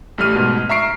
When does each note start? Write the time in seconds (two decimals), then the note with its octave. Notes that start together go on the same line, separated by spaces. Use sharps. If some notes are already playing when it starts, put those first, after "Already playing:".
0.18 A1 G3 A3 F6 D#7
0.35 G#2 B2
0.69 E5 A#5 C#6 C7 D7